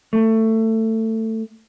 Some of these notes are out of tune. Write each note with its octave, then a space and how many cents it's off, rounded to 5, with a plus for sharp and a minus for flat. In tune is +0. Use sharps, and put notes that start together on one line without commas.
A3 +20